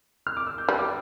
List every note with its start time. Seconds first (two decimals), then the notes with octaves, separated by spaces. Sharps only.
0.27 F6
0.37 D6
0.47 E6
0.58 G6
0.69 G3 F6
0.79 D6